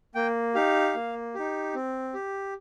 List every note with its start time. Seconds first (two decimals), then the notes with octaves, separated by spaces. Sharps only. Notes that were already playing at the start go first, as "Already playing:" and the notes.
0.15 A#3 G5
0.55 D#4 G4 F5
0.95 A#3
1.35 D#4 G4
1.74 C4
2.14 G4